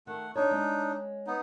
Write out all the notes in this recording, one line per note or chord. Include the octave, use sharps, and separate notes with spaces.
D#3 A3 F#5
D4 D#4 C#5
G#3 C#4
B3 D#4